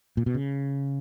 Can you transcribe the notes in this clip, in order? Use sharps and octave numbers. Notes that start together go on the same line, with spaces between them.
A#2
B2
C#3